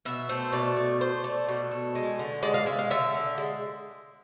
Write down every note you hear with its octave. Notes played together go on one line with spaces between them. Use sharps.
B2 E5
A3 C5
B2 D5
A3
A3 C5
A3 D5
B2
A3
G#3
D3
G#3 D5
F5
G#3 E5
F5
D3 E5
D3
G#3